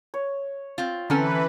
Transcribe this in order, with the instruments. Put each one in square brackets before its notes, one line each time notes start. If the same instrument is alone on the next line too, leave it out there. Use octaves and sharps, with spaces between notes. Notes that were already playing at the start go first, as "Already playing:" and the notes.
[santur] C#5
[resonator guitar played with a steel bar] C4 F4
[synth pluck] D3 C#4 [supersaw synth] E3 B4 [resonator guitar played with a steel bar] C4 A4 [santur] A#5